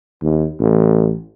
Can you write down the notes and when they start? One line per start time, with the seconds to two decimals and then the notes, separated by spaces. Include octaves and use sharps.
0.23 D#2
0.60 A1